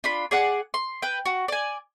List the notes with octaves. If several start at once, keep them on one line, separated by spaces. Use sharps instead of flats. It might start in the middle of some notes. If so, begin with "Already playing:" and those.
D4 F4 B5
G#4 D5 F#5
C6
B4 G5
F#4
D5 G#5